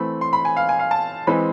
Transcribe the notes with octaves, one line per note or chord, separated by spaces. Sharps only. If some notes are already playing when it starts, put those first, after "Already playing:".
Already playing: E3 A3 C4 B5
C6
B5
G#5
F5
G#5
F5
A5
E3 G#3 C4 B5